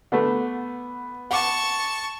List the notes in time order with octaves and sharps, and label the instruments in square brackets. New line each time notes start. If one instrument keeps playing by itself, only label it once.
[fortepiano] D3 A3 [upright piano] B3
[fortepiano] F#5 D6 [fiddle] A5 C#6